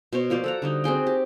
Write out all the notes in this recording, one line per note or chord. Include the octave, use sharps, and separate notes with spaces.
B2 C5 C#5
F3 A#3 C5 D5
A4 F#5 A#5
D3 G3 D#4
C4 F#4 G#4 G5
G4